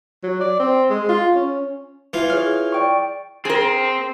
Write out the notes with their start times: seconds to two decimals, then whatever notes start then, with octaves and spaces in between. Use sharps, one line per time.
0.23 F#3
0.40 D5
0.59 C4
0.90 G#3
1.09 F4
1.35 C#4
2.13 E3 F4
2.30 G#4 C#5 F6
2.72 D5 G5 C#6
3.45 C4 G#4 A#4